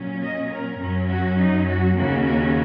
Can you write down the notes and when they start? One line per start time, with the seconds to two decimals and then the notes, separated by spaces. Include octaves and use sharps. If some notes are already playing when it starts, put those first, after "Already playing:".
Already playing: A#2 F#3 C#4
0.22 D#5
0.52 A#4
0.81 F#2 F#3 C#4
1.10 F#4
1.39 D#4
1.68 F#4
1.98 D#2 C#3 A#3 C#4 F#4
2.27 F#4